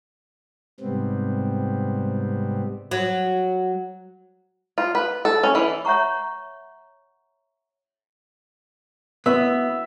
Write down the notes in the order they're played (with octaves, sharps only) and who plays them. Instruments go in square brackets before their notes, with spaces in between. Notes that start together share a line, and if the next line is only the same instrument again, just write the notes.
[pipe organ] G#2 C3 G3 B3 C4
[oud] F#3
[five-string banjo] F4
B4
A4
C#4
E3
[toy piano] C#5 E5 F#5 A#5 C#6
[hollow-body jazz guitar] B3 [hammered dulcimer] E5